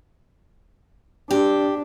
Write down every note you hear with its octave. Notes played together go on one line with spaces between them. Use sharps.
D4 G4